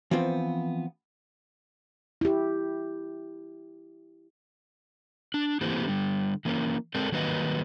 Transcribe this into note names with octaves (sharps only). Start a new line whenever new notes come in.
E3 F3 B3 C4 F4
E4 G4
D4
E3 A3 A#3 C4 E4 G4
D3 G3
E3 A#3 C#4
G#3 C4 A4 A#4 D5
D#3 F#3 G3 A#3 B4 D#5